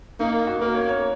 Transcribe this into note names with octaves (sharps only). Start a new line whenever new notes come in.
A#3 D#4
F#4
A#3 A#4
C#5
C#5